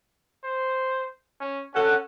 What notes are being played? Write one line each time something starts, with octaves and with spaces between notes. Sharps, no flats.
C5
C#4
C#4 A4 F#5